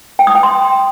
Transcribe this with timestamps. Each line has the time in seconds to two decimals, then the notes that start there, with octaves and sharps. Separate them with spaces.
0.19 G5
0.27 D#6
0.35 G5
0.43 C6